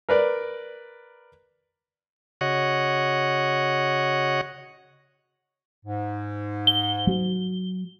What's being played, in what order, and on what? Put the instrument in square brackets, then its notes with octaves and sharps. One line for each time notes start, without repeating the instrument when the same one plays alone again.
[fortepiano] A#4 B4 D5
[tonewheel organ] C#3 F#4 C#5 D#5 F#5
[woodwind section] G#2
[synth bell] G7
[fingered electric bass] F#3